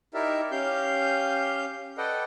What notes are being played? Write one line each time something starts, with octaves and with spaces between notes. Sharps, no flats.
D#4 E4 G4 A#4 D5 E5
C#4 G4 F5 G6
A4 B4 D5 D#5 F#5 G5